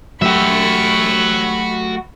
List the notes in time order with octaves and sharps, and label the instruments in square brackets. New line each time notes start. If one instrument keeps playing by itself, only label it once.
[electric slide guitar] F#3 A3 G4 [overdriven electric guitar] F#4 E5 [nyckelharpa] B5 C#6